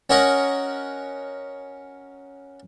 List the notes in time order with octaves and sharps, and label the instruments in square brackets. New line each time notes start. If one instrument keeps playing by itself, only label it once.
[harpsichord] C#4 F#4 A#4 D#5 F#5 C#6